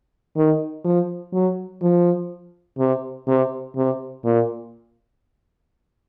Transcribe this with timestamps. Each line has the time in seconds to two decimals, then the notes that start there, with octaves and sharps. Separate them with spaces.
0.37 D#3
0.85 F3
1.33 F#3
1.82 F3
2.78 C3
3.28 C3
3.76 C3
4.25 A#2